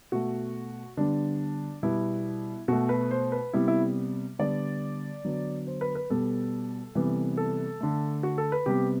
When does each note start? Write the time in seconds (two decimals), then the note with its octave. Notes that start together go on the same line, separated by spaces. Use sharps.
0.12 B2 A3 F#4
0.97 D3 G3 B3 D4
1.83 B2 G3 B3 E4
2.68 B2 A3 F#4
2.89 B4
3.11 C5
3.32 B4
3.53 C3 G3 B3 E4
3.68 E4
4.39 D3 G3 B3 D5
5.25 D3 F#3 B3
5.67 C5
5.81 B4
5.95 B4
6.10 B2 G3 B3 A4
6.95 C3 E3 G3 B3
7.37 A4
7.80 D3 A3
8.23 F#4
8.38 A4
8.52 B4
8.66 C3 G3 B3 G4